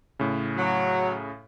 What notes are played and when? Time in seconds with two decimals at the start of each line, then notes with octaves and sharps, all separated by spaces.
0.19 A2 C#3
0.57 F#3